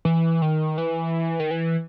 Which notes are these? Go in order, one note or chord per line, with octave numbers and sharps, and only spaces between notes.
E3
D#3
E3
D#3
E3